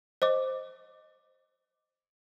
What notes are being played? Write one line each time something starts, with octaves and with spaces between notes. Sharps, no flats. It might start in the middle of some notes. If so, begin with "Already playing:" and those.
C5 D#5 D6